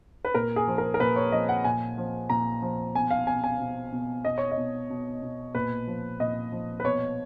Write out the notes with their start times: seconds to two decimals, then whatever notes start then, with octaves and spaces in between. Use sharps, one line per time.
0.25 B4
0.34 A#2 A#4
0.56 G#4
0.67 F3
0.78 A#4
0.94 A#4
1.00 A#2 B4
1.16 C#5
1.32 F3 D#5
1.49 F#5
1.64 A#2 G#5
1.98 F3
2.29 A#2 A#5
2.62 F3
2.95 B2 G#5
3.11 F5
3.27 B2 G#5
3.44 G#5
3.60 B2
3.92 B2
4.25 B2 D#5
4.38 C#5
4.51 D#5
4.57 B2
4.90 B2
5.22 B2
5.55 A#2 B4
5.87 F3
6.20 A#2 D#5
6.52 F3
6.80 B4
6.85 B2 C#5